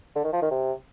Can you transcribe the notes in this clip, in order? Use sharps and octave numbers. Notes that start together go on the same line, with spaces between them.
D3
D#3
F3
D#3
C3